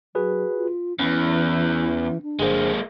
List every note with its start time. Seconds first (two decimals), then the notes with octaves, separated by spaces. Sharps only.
0.15 F#3 F#4 G#4 B4
0.55 F4
0.99 E2 E3 C#4
2.22 D4
2.39 G1 G#3 A#3 G#4 C5